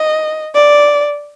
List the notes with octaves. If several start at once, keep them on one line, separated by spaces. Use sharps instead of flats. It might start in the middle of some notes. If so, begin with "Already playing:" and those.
Already playing: D#5
D5